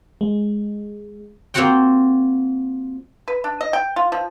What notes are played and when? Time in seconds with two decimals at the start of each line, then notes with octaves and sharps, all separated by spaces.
0.21 G#3
1.54 A#3 C4 F4 F#4 F#5 G5
3.28 B4
3.44 D4
3.61 D#5
3.73 G5
3.96 F4
4.12 F3